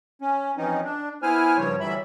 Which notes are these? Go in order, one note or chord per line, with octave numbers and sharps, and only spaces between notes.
C#4
E3 F3 C4 C#4 D#4
D4
B3 E4 C5 G#5 F6
G2 C#3 F3 G3 C#5
D2 E3 F#3 G3 E5 B5